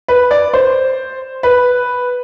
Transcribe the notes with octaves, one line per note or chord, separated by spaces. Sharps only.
B4
D5
C5
B4